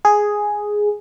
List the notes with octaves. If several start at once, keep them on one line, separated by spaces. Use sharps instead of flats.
G#4